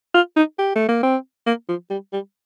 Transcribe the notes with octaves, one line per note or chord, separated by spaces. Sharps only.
F4
D#4
G4
A3
A#3
C4
A#3
F3
G3
G3